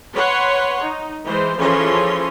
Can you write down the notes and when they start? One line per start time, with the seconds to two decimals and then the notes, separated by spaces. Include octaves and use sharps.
0.15 B4 C#5 F#5 C6
0.82 D#4
1.24 E3 G#3 C5
1.58 E3 F3 C#4 G#4 A4 C6